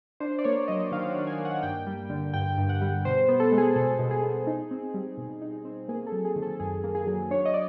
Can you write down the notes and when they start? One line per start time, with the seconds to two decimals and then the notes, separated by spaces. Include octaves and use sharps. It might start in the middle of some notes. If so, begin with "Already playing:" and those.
0.20 D4 C5
0.39 D5
0.44 A#3 C#5
0.68 F#3 D#5
0.92 D#3 F5
1.10 F#5
1.16 D4
1.27 G#5
1.39 A#3
1.45 F#5
1.63 G2 G5
1.87 G3
2.10 D3
2.34 G2 G5
2.58 G2
2.69 F#5
2.81 G3
3.05 B2 C5
3.29 B3
3.40 A4
3.52 G#3
3.58 G#4
3.76 B2 A4
3.99 B2
4.11 G#4
4.23 B3
4.47 D#4
4.71 C4
4.94 G3
5.17 B2
5.42 D#4
5.65 C4
5.88 A#3 G#4
6.07 A4
6.12 F#3
6.25 G#4
6.36 D#3
6.42 A4
6.55 A4
6.60 F#2 G#4
6.84 A#3
6.95 G#4
7.07 F#3
7.30 D4 C#5
7.45 D#5
7.54 D5